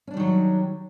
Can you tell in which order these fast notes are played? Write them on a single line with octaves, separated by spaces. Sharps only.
C#4 D4 G3 D#3 F#3